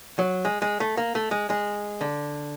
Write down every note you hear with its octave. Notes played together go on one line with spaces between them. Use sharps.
F#3
G#3
G#3
A3
A#3
A3
G#3
G#3
D3